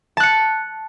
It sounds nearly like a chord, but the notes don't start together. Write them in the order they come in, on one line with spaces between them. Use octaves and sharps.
A5 F#6 C#7